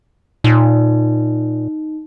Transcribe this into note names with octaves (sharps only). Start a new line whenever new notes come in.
A#2 D#4